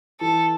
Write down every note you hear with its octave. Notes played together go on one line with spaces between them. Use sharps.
E3 A4